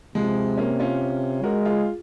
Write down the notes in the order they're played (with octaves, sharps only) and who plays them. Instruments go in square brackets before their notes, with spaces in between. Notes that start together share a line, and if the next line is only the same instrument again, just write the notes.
[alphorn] C3 [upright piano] F3 G#3
[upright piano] A#3 C#4
C#4 F4
[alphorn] G#3 [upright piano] F#4 A#4
[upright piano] F4 G#4